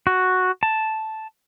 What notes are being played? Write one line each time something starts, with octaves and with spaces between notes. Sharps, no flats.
F#4
A5